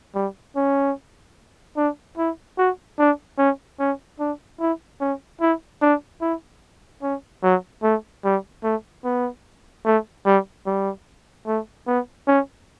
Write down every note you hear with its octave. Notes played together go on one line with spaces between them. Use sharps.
G3
C#4
D4
E4
F#4
D4
C#4
C#4
D4
E4
C#4
E4
D4
E4
C#4
F#3
A3
G3
A3
B3
A3
G3
G3
A3
B3
C#4